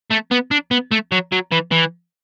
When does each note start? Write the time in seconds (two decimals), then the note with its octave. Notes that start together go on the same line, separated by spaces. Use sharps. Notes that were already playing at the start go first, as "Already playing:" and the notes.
0.10 A3
0.31 B3
0.51 D4
0.71 B3
0.91 A3
1.12 F#3
1.32 F#3
1.52 E3
1.71 E3